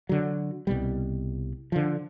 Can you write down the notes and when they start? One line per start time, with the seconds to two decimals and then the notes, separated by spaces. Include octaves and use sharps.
0.09 D3 F#3
0.67 C2 B2 G3
1.72 D3 F3